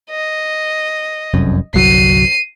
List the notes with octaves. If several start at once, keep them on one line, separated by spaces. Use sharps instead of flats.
D#5
F1 C2 F#2
G1 C2 F#3 C7 D#7